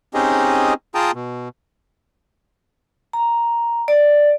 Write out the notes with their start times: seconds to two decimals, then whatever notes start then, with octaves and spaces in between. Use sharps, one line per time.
0.14 C4 C#4 D#4 G4 G#4 D#5
0.95 F4 G#4 G5 A5 A#5 D#6
1.15 B2
3.13 A#5
3.88 D5